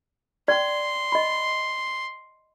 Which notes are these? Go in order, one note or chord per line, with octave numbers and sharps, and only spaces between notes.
D5 G5 C6
D#5 B5